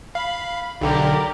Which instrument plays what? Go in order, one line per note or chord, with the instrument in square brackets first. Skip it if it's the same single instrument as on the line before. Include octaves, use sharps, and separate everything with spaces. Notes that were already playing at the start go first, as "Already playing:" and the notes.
[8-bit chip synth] F5 [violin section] B5
[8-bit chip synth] B1 D3 [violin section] G4 A#4 D5